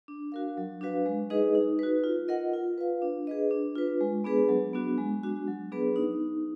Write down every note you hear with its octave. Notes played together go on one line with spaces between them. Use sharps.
D4
F#4 A#4 F5
F#3
D4 F#4 B4 F5
G#3
D#4 G#4 B4 D#5
D#4
F#4 B4
F4
A#4 D#5 F#5
F4
B4 F5
D4
G#4 B4 D#5
D4
F4 B4
G#3
B3 D4 G#4 B4
F#3
B3 D4 F#4
G#3
D4 F#4
F#3
B3 D4 G#4 B4
D#4